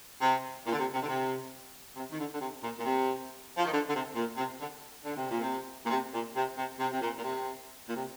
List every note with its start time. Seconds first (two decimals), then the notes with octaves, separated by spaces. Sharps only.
0.20 C3
0.64 A#2
0.71 D3
0.78 C3
0.93 C3
1.03 D3
1.07 C3
1.95 C3
2.10 D#3
2.17 D3
2.32 D3
2.39 C3
2.61 A#2
2.77 A#2
2.83 C3
3.55 F3
3.63 D#3
3.71 D3
3.87 D3
3.93 C3
4.15 A#2
4.36 C3
4.58 D3
5.03 D3
5.15 C3
5.29 A#2
5.41 C3
5.83 A#2
5.90 C3
6.12 A#2
6.34 C3
6.56 C3
6.78 C3
6.91 C3
7.00 A#2
7.17 A#2
7.21 C3
7.87 A#2
7.94 C3